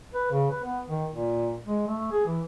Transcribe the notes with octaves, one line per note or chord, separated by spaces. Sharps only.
B4
C#3
B4
B3
D#3
A#2
G#3
A3
G#4
E3